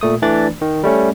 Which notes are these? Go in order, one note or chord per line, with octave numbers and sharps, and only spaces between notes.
A#2 A3 D#6
E3 A3 D4 D5 A6
D#3
G3 A3 C#4